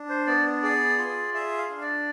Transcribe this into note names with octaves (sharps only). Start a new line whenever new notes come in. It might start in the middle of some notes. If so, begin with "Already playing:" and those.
Already playing: D4
C5
B3 D5
G#4 D5
F4
G#4 E5
F5
D4
D5